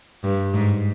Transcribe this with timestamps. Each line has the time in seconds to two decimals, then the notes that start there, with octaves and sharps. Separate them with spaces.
0.24 G2
0.53 G#2